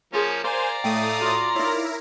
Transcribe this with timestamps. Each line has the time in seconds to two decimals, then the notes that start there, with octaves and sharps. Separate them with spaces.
0.13 F3 A#3 C#4 F4 G#4
0.44 A#4 C5 D5 F5 G#5 A#5
0.84 A2 A3 G5 D#6
1.21 F4 F#4
1.55 D#4 E4 A#4 C#5